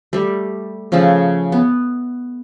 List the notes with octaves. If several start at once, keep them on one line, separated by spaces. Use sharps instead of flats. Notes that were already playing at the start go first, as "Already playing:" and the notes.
G3 A3
C#3 F3 A3 A5
B3